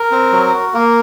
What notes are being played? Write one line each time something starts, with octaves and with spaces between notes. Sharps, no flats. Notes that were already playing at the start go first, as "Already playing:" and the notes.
Already playing: A#4
C4
F#3
F#4
A#3 A#4